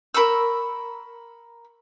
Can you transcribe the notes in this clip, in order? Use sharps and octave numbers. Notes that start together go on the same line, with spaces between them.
A#4 B5 C#6 E6